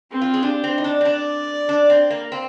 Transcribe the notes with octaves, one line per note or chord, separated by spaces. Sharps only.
C4
F4
G#4
D4 G4
C4
D#4
D4
C4
D4 D5
D4
C4
A#3
C4